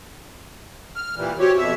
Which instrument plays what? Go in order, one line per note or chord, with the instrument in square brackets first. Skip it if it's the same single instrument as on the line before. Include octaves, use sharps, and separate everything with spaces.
[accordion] F6
A#2 E3 G3
[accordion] C4 G4 C#5 [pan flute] F#4
[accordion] F2 B2 E5